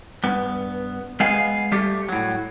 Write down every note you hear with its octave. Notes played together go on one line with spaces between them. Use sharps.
G2 B3
G#3 B3 G#4 F5
G3 A3 G4
A2 F#3